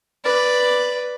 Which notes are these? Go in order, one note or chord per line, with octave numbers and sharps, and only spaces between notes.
B4 D5